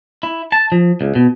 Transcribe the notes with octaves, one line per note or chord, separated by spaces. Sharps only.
E4
A5
F3
C#2
B2